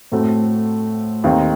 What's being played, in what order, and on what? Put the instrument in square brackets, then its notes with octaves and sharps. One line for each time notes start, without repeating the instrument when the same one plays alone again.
[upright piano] A2 A3 C4 F#4 A4
D#2 D#3 A3 C4 D#4